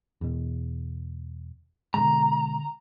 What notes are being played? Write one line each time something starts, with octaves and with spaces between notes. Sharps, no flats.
E2 B2
B2 D3 G#3 A#5